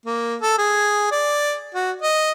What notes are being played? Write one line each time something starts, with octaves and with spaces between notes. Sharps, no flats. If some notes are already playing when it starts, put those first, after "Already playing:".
A#3
A4
G#4
D5
F#4
D#5